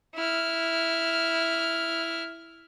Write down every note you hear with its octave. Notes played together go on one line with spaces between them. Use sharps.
E4 F6